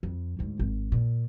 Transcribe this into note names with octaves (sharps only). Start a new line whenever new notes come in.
F2
D2 G#2
G#1
A#2